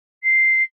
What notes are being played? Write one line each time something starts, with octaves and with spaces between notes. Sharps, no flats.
C7